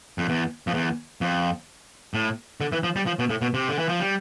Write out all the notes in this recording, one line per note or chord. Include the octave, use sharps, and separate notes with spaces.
F2
E2
F2
E2
F2
A2
D3
E3
F3
G3
F3
B2
A2
B2
C3
D3
E3
F3
G3